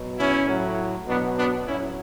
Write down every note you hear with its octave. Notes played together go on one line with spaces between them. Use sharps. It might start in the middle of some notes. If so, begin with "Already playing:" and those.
Already playing: B2 F#3
C#4 E4
A2 F#3
B2 F#3 B3 D4
B3 D4
A2 F#3 C#4 E4